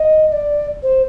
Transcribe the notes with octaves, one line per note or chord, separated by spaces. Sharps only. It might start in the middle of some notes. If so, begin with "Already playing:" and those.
Already playing: D#5
D#5
D5
C5